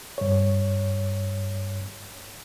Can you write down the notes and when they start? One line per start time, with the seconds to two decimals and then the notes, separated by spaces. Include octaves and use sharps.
0.18 G2 C#5